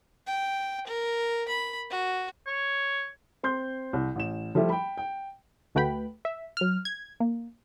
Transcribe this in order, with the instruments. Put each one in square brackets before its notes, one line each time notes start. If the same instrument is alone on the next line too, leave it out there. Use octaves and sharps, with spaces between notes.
[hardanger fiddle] G5
A#4
B5
F#4
[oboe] C#5
[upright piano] C4 C6 G6
C2
A1 E7
F3 G3 A3 E4 G4
G5 B5
G5
[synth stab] D2 A3 F#4 B4 G5 B5
E5
F#3 F6
G#6
A#3